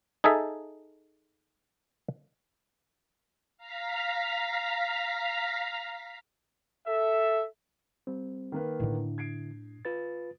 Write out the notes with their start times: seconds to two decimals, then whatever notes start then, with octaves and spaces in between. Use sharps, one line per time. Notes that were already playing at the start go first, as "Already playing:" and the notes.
0.24 D#4 G#4 A4 E5
3.58 F5 A#5 B6
6.87 A4 E5
8.07 G3 C4
8.52 D#3 A#3 B4
8.80 A2 D3 D4 E4
9.18 G#6 C7 D7
9.85 F4 B4 A6